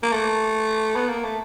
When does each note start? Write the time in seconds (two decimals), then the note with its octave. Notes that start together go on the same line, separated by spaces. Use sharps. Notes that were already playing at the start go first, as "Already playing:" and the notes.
0.03 A#3
0.12 A3
0.96 B3
1.09 A#3
1.24 A3